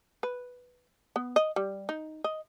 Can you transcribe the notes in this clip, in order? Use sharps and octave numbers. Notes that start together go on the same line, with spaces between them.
B4
B3
D#5
G3
D#4
D#5